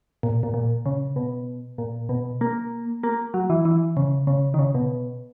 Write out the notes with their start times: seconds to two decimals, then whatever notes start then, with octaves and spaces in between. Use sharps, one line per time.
0.23 A#2
0.43 A#2
0.54 A#2
0.86 C#3
1.16 B2
1.78 A#2
2.09 B2
2.41 A#3
3.03 A#3
3.34 F#3
3.50 E3
3.65 E3
3.97 C#3
4.27 C#3
4.54 D#3
4.59 C#3
4.75 B2